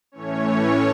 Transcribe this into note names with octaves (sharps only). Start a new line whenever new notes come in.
A2 E3 A3 C#4 C#5